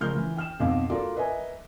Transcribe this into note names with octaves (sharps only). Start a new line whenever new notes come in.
C#3 F3 A#4 F6 G6
E3
G5 F6 E7
B1 F2 D#5 F5 D6
F4 F#4 A4 A#4 D5 D6
A#4 B4 D#5 E5 G#5